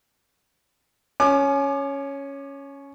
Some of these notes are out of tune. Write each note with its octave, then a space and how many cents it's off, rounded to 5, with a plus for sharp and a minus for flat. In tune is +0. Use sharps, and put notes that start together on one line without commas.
C#4 +0 G#5 +30 D6 +30